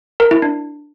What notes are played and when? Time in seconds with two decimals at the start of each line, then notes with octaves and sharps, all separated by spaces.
0.20 A#4
0.31 E4
0.42 D4